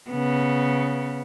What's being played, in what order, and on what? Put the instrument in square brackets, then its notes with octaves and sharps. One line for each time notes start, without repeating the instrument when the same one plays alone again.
[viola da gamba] C#3 B3